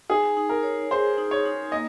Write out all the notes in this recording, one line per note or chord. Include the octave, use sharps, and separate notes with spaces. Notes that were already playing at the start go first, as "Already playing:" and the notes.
D#4 G#4
D#4
A#4
C#5
G#4 C5
D#4
C#5
D#4
A#3 D#5